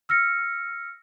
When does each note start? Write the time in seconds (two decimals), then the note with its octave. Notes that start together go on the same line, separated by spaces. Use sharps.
0.09 E6 F6 A#6 C#7